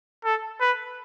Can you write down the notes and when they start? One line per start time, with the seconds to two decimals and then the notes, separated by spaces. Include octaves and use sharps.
0.25 A4
0.61 B4